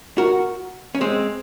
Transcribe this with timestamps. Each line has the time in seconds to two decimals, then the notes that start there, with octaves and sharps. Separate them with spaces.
0.18 F#4 A#4
0.95 C#4
1.01 G#3 C4